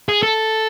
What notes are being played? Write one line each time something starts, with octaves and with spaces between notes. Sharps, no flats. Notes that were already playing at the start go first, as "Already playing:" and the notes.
G#4
A4